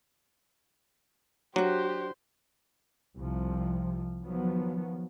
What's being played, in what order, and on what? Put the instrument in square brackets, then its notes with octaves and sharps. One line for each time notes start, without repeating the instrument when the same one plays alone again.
[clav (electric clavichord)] F#3 [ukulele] D4 F#4 [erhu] G4 [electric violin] C5
[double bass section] C2 C3 F3
D#3 F3 F#3 B3